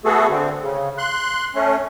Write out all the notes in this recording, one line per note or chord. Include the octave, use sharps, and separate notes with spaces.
A3 B3 F#4 G#4 A4
D3 C4
C#3
C6 F#6
A3 C#4